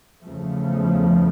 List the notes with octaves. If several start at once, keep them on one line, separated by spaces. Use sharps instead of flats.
E2 C#3 F3 A3